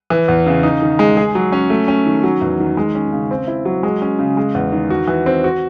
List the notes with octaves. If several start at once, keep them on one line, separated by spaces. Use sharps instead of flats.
E3
E2
C#3
D#4
D#3
G#3
G#4
F#3
C#4
A3
C#4
D#3
F#3
E2
D#3
G#3
C#4
C#3
C4
E4
F#3
G#3
C#4
C#3
G#3
E2
D#3
F#4
E3
C4
F#4